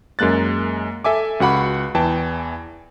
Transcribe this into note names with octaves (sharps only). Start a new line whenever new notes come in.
F#2 G#3 A#3 F#6 A6
A4 E5 G#5 D6
C#2 F#4 F#5 B5 D6
E2 E3 G5 A5